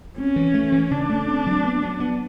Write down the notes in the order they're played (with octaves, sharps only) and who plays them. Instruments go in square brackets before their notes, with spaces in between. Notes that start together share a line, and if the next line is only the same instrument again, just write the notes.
[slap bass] C4 [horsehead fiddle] C#4
[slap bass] E3
A3
E3
[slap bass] C#3 [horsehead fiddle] D4
[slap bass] A3
C4
F#3
B3
F#3
B3